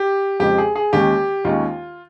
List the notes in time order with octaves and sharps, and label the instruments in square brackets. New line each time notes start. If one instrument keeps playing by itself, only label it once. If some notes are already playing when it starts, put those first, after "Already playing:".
Already playing: [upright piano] G4
F2 C#3 G#3 C4 G4
G#4
G#4
D#2 D#3 G#3 C#4 G4
D#2 D#3 G#3 C#4 F4